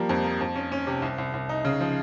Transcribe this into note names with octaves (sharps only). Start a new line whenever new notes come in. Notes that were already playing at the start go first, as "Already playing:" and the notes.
Already playing: F3 G3 A#3
F2
A#3
F2
C#4
C#4
C3
C2
C2
C2
D#4
C#3
F3